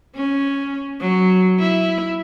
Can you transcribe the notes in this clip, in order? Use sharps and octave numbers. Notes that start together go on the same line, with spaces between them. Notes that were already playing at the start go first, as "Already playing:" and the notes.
C#4
F#3
E4